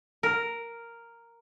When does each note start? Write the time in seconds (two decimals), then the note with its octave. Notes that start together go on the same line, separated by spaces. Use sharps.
0.23 A#4